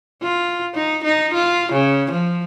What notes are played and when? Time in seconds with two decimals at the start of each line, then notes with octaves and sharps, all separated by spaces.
0.23 F4
0.75 D#4
1.04 D#4
1.34 F4
1.72 C#3
2.12 F3